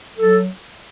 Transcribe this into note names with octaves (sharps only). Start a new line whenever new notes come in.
F#3 A4